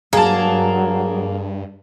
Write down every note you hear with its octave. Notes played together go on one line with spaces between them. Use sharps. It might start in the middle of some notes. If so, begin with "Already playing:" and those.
G2 F#3 A#3 G#4 A5